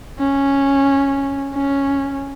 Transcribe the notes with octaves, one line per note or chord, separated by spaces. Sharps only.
C#4
C#4